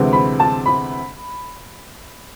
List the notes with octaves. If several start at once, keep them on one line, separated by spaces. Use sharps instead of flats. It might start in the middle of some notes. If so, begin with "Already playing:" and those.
Already playing: D2 C3 E3 G#3
B5
A5
B5